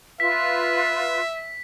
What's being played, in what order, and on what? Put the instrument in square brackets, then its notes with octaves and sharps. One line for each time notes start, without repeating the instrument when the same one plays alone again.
[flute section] F4 B4 [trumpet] E5 [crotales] B6